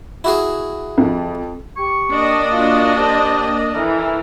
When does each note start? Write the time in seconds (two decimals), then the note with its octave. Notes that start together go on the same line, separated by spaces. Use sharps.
0.24 E4 F#4 G#4
0.98 F2
1.77 G4 C#6
2.11 A#3 D4 D#5
2.52 F4 F#4
2.97 G4 C5 A5
3.74 E3 E4 A4 A#4